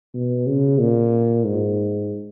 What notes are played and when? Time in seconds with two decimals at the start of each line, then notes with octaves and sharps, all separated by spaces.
0.14 B2
0.47 C#3
0.79 A#2
1.45 G#2